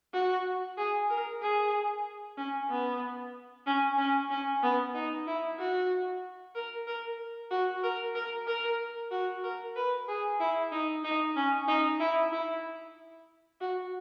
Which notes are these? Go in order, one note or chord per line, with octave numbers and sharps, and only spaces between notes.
F#4
G#4
A#4
G#4
C#4
B3
C#4
C#4
C#4
B3
D#4
E4
F#4
A#4
A#4
F#4
A#4
A#4
A#4
F#4
A#4
B4
G#4
E4
D#4
D#4
C#4
D#4
E4
E4
F#4